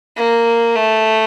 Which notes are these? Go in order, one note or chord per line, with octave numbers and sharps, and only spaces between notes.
A#3
A3